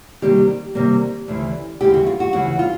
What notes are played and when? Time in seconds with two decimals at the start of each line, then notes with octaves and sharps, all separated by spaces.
0.22 C3 D#3 G3 A#3 G4
0.75 C3 D#3 G3 A#3
1.28 D2 C#3 E3
1.81 D2 C#3 E3 G4
1.94 F#4
2.06 F4
2.20 F#4
2.33 D2 C#3 E3 F#4
2.59 F4